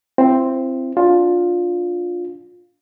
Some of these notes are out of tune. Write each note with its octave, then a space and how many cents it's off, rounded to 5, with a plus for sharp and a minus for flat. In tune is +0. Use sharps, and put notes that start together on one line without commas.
C4 +0 E4 +40
D4 -15 F4 +15